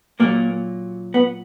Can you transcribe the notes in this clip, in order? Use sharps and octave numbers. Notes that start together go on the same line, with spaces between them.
A#2 F#3 A#3
B3